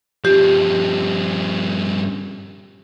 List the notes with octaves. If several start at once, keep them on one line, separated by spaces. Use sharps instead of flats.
G2 F3 G4